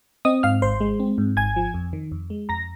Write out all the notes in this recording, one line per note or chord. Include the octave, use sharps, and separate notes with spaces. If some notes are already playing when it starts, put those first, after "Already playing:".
C4 D#5 D#6
G#2 F5 F6
G#1 C5 C6
G#3
C4
G#2
G#1 G#5 G#6
F3
F2
D#3
F2
G#3
F2 A#5 A#6